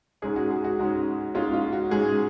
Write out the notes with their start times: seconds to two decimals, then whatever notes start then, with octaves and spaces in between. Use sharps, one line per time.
0.22 G#2 G#3 C#4 G#4
0.36 F#4
0.51 G#4
0.64 F#4
0.79 G#2 G#3 C#4
1.34 G#2 G#3 C#4 F4
1.53 F4
1.72 F#4
1.91 G#2 G#3 C#4 G#4